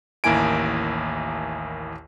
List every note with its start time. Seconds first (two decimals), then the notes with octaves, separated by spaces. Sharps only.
0.24 A1 D#2 A#3 E4 G#5 D7